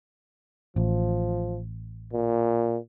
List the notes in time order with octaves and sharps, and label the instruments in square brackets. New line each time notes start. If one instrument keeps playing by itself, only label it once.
[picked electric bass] A1 [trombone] F3
[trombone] A#2